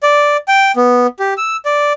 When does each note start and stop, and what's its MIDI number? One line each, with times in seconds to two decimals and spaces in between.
0.03 0.37 74
0.48 0.72 79
0.76 1.07 59
1.19 1.34 67
1.37 1.57 88
1.65 1.93 74